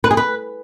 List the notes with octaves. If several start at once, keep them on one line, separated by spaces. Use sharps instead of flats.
B4
G#4
B4